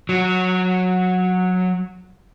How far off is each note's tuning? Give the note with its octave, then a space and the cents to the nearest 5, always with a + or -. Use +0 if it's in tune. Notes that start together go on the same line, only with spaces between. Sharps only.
F#3 -15